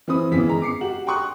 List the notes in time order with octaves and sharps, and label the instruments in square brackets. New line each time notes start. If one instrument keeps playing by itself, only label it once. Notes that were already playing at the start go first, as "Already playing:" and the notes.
[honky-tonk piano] E3 C4 B5 D#6
G#1 E2 C#3 E3 E4 B6
G#3 A#5
D6 C7 C#7
F#4 G4 F#7
G5 A#5 C6 C#6 D#6 F#6